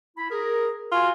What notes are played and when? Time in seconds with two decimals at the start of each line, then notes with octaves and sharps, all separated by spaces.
0.17 E4 B5
0.30 G#4 A#4
0.92 F4 F#4 G#5